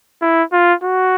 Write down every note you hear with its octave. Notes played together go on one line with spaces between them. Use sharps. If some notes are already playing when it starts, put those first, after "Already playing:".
E4
F4
F#4